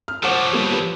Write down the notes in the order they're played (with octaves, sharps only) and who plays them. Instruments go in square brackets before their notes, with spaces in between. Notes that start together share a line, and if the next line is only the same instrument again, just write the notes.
[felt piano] F6
[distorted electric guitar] F3 F#3 [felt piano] C5 F#5 D6
[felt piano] G3 A#3 B3
G4 B4